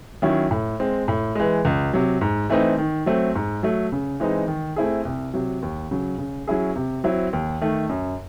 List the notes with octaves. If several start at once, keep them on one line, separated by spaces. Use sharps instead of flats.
D#3 F#3 C#4 E4
A2
G#3 C4
A2
E3 G#3
C#2
C3 F#3
G#2
E3 A3 C4 D#4
D#3
F#3 A3 C4
G#2
F#3 A3
C#3
E3 G#3 C4 D#4
D#3
A3 C4 E4 G#4
C2
C3 F#3
D#2
C#3 F#3
C#3
F#3 C#4 E4 G#4
C3
F#3 C4 E4
D#2
D#3 A3
F#2